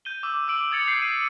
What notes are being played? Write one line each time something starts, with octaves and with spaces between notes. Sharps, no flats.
G6 D#7 G7
D6 E6
D6 E6 D7 F#7
D#6 G#6 A6 C#7 F7
G6 C7
C7 D#7